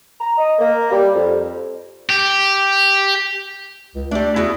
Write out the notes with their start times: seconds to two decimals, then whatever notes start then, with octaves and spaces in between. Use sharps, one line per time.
0.20 A#5
0.38 D#5
0.59 A#3
0.91 G3
1.14 F2
2.09 G4
3.95 C#2
4.11 G3 A3 D4
4.36 E2 E4 F#4 G#4